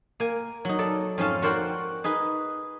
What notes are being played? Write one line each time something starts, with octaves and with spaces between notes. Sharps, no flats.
A#3 G#5
F#3 D#4
A4 D5
F2 G#2 C#4 F5 A5
F#4 A#4 C5 D5 F#5 G5
D#4 G#4 B4